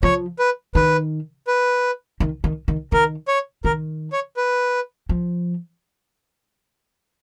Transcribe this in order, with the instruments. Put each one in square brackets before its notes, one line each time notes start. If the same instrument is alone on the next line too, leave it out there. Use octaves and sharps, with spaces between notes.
[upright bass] F3 [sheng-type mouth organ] C#5
[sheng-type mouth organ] B4
[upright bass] D#3 [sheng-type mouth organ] B4
[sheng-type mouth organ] B4
[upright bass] D#3
D#3
D#3
[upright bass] D#3 [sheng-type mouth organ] A#4
[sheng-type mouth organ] C#5
[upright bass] D#3 [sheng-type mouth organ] A#4
[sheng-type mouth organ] C#5
B4
[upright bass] F3